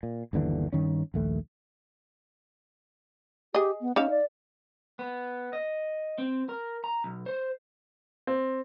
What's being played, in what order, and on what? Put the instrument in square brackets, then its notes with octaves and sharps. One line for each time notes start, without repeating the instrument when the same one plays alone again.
[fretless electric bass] A#2
G1 D#2 D3 E3
G2 D#3 C#4
A#1 D#2 A3
[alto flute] G4 [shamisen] G#4 D#5
[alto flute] B3
[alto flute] C#4 [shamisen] D#4 E5 F5
[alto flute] D5
[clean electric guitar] B3
D#5
C4
A#4
A#5
B1
C5
[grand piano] C4